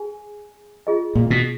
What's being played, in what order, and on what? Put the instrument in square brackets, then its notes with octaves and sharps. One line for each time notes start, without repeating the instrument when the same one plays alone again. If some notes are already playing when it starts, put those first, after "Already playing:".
Already playing: [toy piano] G#4 G#5
F4 G#4 D#5
[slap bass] A#2
B2